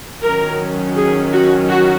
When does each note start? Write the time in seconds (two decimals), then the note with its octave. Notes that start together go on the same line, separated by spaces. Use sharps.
0.23 D#3 F#3 C#4 A#4
0.96 G#4
1.32 F#4
1.69 F#4